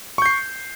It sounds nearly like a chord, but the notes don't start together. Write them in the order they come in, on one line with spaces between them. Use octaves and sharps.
C#6 G6 C7